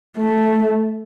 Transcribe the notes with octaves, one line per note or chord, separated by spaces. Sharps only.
A3